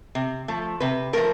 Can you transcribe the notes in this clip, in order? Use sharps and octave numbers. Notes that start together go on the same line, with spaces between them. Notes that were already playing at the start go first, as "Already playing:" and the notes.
C3
F3 A3
C3 B4
F3 A3 A#4